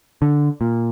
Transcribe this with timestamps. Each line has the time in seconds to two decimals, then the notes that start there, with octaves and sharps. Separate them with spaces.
0.22 D3
0.61 A#2